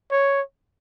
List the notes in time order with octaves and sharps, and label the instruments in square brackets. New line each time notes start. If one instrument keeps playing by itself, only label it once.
[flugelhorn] C#5